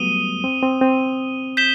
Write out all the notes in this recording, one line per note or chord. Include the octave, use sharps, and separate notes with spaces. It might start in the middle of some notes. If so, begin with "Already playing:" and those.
Already playing: F#3 G3 A3 B3 D#6 D#7 G7
C4
C4
C4
G6 B6 E7 G7